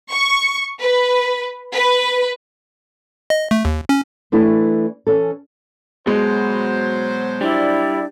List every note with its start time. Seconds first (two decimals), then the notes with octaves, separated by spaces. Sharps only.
0.11 C#6
0.79 B4
1.72 B4
3.30 D#5
3.51 A3
3.65 D#2
3.89 C#4
4.32 E3 A3 D4 E4
5.07 E3 C#4 A4
6.07 B2 F#3 G#3 C5
7.41 G3 D4 E4 D5